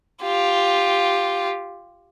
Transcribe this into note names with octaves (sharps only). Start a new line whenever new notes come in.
F4 G4